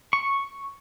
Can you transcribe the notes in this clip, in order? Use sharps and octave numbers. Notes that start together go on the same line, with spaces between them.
C#6